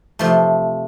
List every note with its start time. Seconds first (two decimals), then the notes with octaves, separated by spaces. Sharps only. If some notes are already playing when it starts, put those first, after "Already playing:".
0.19 C3 F3 A3